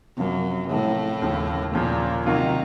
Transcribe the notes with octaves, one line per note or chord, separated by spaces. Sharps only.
F#2 C3 F3 A#3
A2 C3 F3 A#3
D#2 C#3 F3
D#2 A#2 C#3 F3
C3 D#3 F#3 A#3 F4